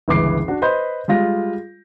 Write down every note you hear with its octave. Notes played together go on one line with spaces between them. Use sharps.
G1 C#2 E3 G#4 D6 C7
D4 F#4
B4 C5 D#5 B5 C6 G6
G3 G#3 F4 A#6